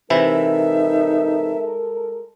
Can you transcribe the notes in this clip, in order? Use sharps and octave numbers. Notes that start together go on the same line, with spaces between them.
C3 E3 G#3 D#4 E4 A4 A#4 E5